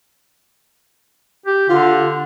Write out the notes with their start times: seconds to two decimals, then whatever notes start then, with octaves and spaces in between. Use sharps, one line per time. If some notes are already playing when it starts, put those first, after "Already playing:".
1.46 G4
1.70 D3 F4